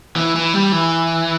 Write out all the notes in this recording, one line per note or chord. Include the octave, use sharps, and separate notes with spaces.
E3
E3
G3
E3